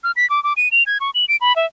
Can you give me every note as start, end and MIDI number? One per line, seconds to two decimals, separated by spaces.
0.04 0.12 89
0.16 0.28 95
0.30 0.42 86
0.44 0.53 86
0.57 0.69 99
0.72 0.83 101
0.86 0.98 92
1.01 1.11 85
1.15 1.25 102
1.28 1.36 98
1.41 1.55 83
1.56 1.66 76